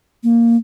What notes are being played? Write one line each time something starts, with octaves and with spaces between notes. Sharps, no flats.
A#3